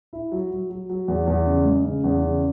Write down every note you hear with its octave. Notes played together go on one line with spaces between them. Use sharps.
E4
F#3
F#3
F#3
F#3
E2
E2
C#3
G#3
C#3
E2
C#3